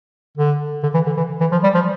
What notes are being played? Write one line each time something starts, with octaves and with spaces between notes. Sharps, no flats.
D3
D3
E3
D3
E3
E3
F3
G3
F3